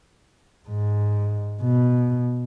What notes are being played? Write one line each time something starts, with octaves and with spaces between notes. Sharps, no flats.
G#2
B2